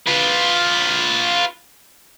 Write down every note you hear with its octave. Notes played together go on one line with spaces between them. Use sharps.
F4 B4